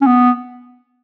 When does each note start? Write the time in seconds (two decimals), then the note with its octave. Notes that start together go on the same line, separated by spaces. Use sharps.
0.01 C#4
0.06 B3